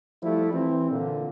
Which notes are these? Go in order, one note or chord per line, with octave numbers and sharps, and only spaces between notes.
F3 G3 A3 E4
E3 C4
A#2 D3